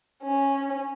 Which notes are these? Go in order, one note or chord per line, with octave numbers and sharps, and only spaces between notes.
C#4